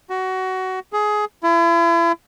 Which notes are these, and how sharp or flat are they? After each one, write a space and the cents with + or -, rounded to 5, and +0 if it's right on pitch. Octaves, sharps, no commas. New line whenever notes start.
F#4 +20
G#4 +20
E4 +40